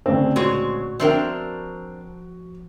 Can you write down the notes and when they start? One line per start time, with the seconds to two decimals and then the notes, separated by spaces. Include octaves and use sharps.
0.06 D2 C#3 C4
0.36 A#2 G#3 C4 F#4 C#5
1.00 F3 C4 D4 A#4 E5 G5